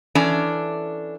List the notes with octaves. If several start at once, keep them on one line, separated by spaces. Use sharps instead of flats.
E3 C#4 D4 A4